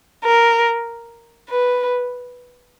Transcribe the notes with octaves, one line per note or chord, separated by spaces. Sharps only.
A#4
B4